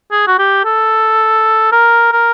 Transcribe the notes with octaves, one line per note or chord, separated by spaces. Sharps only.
G#4
F#4
G4
A4
A#4
A#4